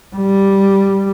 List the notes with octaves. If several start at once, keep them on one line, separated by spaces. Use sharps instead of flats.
G3